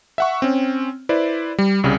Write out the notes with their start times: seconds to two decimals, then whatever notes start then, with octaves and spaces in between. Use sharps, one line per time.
0.18 E5 F#5 C#6
0.42 C4 C#4
1.09 E4 B4 C5 D5
1.58 G3
1.84 C2 C#3 G3